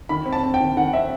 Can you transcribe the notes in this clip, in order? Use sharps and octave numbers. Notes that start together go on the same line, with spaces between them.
D#3 B5
C4
A5
C4
G5
D#3
D#3 F#5
C4 E5